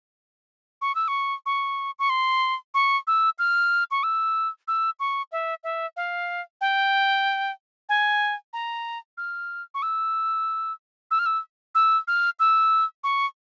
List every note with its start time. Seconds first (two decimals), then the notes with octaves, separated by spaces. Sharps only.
0.82 C#6
0.95 E6
1.08 C#6
1.46 C#6
1.99 C#6
2.10 C6
2.74 C#6
3.07 E6
3.39 F6
3.91 C#6
4.03 E6
4.68 E6
5.00 C#6
5.32 E5
5.64 E5
5.96 F5
6.61 G5
7.89 G#5
8.53 A#5
9.17 F6
9.74 C#6
9.82 E6
11.11 E6
11.19 F6
11.26 E6
11.75 E6
12.08 F6
12.40 E6
13.04 C#6